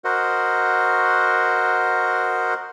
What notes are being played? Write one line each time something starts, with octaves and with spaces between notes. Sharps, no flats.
F#4 A#4 C5 D#5 F#5